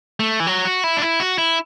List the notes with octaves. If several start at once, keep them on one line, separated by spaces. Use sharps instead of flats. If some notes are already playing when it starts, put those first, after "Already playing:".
A3
E3
F#3
F#4
E4
D4
E4
F#4
E4